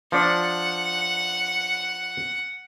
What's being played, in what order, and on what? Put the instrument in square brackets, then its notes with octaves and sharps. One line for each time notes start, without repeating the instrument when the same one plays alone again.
[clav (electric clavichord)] F3 D4 [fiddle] F#5